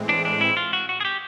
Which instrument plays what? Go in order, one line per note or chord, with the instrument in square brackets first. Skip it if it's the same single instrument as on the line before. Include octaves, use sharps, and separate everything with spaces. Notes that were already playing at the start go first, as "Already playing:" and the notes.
Already playing: [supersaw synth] A2 E3 G#3 C4
[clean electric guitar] D4
D4
E4
F4
F#4
F#4
G#4
G4